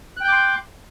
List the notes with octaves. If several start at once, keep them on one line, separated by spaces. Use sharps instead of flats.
G5 C6 D6 F#6 G6